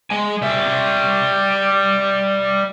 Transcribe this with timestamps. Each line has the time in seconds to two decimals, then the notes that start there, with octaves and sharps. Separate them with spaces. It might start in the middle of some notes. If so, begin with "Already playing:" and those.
0.10 G#3 G#5
0.42 G3 E5